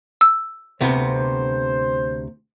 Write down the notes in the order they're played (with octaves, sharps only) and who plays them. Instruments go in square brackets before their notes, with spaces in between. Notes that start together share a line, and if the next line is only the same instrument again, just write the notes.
[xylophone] E6
[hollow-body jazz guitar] D2 C3 B3 [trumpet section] C5